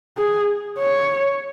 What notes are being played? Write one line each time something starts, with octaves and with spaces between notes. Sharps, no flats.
G#4
C#5